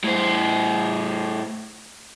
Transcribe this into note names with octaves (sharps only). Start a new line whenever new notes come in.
A2 C5